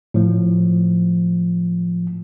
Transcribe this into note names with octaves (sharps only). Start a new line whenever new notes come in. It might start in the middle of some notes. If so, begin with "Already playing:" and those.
A2 F3